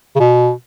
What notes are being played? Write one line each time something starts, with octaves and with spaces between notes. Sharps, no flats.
C#3
B2